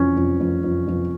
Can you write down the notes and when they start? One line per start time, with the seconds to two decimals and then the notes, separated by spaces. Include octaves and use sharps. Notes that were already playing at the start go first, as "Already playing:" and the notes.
Already playing: F2 E3 C#4
0.17 F2
0.40 F2
0.64 F2
0.87 F2